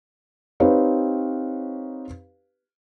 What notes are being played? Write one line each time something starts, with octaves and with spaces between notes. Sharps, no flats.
C4 D#4 G4 B4 C#5 F5